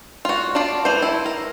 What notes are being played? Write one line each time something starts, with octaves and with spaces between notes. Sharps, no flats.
F4 F#4
D4 F4 D5
E3 C5
E4
A#4